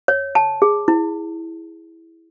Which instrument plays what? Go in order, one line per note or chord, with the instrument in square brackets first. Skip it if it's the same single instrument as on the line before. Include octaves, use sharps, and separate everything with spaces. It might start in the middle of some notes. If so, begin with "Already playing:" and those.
[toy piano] C#5
A5
G#4
E4